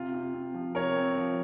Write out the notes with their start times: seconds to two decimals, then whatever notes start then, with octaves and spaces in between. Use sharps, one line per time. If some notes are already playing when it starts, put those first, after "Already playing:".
Already playing: C3 F4
0.14 C3
0.34 C3
0.54 F3
0.75 C3 A#4 C#5
0.96 C4
1.17 F3